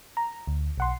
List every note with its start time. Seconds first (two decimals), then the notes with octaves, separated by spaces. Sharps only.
0.17 A#5
0.47 D2
0.78 B1 F#5 C6